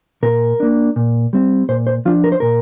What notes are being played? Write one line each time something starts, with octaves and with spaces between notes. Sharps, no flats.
A#2 A#4
A#3 D4
A#2
G3 C4
A#2 C5
C5
F3 D4 F4
A#4
C5
A#2 A#4